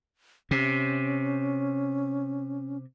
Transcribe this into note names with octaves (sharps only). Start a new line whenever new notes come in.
C3 C#4